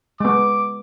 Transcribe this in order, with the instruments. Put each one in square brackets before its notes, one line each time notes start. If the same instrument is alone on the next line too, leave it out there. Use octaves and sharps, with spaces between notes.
[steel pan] G#3 B3 [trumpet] D6